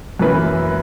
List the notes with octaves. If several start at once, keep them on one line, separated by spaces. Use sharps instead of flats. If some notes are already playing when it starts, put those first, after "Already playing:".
F#2 E3 A#3 E4 B4